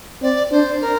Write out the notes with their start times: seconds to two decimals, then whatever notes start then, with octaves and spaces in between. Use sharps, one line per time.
0.22 C4 D5
0.51 D4 C5
0.81 A#4